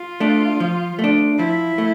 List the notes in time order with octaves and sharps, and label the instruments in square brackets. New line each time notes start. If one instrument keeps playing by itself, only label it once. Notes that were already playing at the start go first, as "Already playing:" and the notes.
Already playing: [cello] F4
[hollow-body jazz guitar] A3 D4
F3
A3
D4
[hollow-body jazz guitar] F3 [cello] E4
[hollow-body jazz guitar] A3